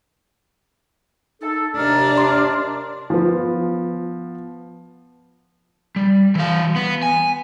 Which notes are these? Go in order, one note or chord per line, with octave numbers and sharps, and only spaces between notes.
D#4 A4
D#2 C3 D4 A#5 F6
C6
F3 B3
G3
E3 F5
B3
G#5